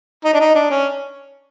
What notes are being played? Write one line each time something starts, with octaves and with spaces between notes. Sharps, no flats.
D#4
D4
D#4
D4
C#4